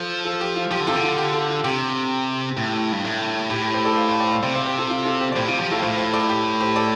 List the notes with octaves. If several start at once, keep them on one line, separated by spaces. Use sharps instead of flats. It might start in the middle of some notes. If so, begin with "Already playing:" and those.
Already playing: F3 F4 A4
F4 A4
G4
F4
F3 G4
D3
C3 F4 A4
D3
F4
G4
F4 A4
F4
C3 G4
A2
G2
A2
A2 G4
G4
G4 C5
A4 D5
C5 F5
C5 F5
D5 G5
C5 F5
C3 D5 G5
C5 F5
G4 C5
F4 A4
F4
F4 A4
G4 C5
D5
A2 G4 C5
C3 F4
F3 G4
A2 F4 A4
A2 C5 F5
C5 F5
A4 D5
G4
G4 C5
A4 D5